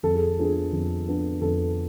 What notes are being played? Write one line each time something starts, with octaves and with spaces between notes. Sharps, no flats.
F2 A4
G#4
F3 B3 D4 G#4
F2
F3 B3 D4
F2 A4